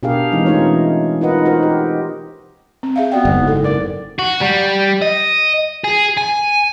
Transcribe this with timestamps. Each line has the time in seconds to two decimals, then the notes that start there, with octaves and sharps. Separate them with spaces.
0.03 B2 D4 G4 G#4 A#4 F5
0.32 E3 G#3 C4 D#4
0.46 A3 C#4 D#4 F4 C#5
1.21 D#4 F4 A#4 B4 D#5 F#5
1.45 D#4 F#4 A#4 C5
1.63 G4
2.83 C4
2.96 G#4 E5 F5
3.12 B3 F#4 D5 G5
3.25 F#1 G#2
3.47 A4
3.64 A#4 D5
4.19 F#4
4.41 G3
5.02 D#5
5.84 G#4
6.17 G#5